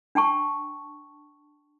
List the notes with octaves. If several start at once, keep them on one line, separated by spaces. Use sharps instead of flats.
D4 G5 A5 C#6